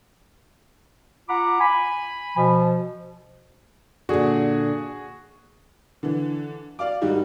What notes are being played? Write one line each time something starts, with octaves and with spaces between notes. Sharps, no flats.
F4 F#5 A#5 B5 D6
G#5 B5
B2 F3
A#2 D3 F#4 G#4
D3 E3
D5 F5 D6
G#2 D#3 G3 D#4 F#4